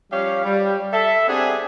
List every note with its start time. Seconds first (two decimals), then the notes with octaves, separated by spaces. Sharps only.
0.12 F3 G3 C#4 G4 C#5 F5
0.44 G3
0.93 A4 E5
1.28 B3 C4 D4 G4 G#4